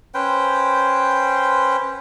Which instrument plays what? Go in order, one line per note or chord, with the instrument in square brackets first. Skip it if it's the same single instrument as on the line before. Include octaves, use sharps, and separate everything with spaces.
[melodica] C#4 B4 C5 G5